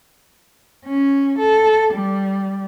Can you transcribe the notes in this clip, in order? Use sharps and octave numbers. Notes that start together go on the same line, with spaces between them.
C#4
A4
G3